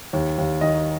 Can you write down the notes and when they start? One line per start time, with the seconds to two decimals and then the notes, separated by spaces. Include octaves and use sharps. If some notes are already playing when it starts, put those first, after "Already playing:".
0.13 D#2
0.38 D#2
0.61 D#3 D#5